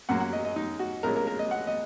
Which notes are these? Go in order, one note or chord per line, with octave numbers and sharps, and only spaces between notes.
F#2 F#3 A#3 C#4 F#5
F#5
D#5
D#5
D#4
F#4
A#1 A#2 G#3 C#4 A#4
A#4
A#4
D#5
F#5
D#5